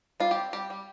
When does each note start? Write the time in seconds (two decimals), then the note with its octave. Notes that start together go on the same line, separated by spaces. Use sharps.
0.20 G3 F4
0.31 G4
0.37 C4
0.53 G3 G4
0.70 G3